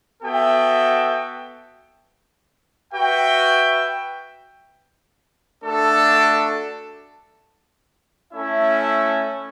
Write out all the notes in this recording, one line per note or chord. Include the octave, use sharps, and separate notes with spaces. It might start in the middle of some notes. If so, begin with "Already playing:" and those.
B3 F#4 A4 E5 G5
F#4 B4 E5 G5
A3 D4 F#4 A4
A3 C#4 E4 A4 E5